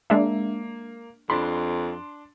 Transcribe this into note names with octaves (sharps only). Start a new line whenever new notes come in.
G#3 A#3 D4 E5
F2 D4 B5 C6